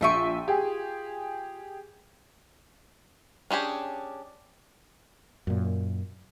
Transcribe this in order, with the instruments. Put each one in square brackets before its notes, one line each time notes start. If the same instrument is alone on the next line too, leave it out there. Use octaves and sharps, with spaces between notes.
[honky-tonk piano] A#1 E5 D#7 [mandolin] F4 G5 C#6
[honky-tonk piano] G4 G#4
[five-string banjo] C#4 D4 G4 G#4
[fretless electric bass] F#2 A#2